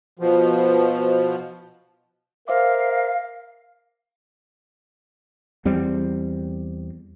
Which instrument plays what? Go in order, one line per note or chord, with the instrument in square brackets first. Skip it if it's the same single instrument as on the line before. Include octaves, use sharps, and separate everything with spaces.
[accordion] B2 F3
[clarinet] A#4 [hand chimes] C5 E5 D6 [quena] F5
[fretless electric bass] E2 G3 C4